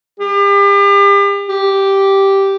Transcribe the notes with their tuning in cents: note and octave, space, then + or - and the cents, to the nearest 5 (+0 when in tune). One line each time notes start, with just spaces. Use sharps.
G4 +40
G4 -5